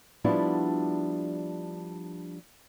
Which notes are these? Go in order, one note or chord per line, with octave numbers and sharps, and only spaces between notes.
F3 G3 B3 D4 E4 F#4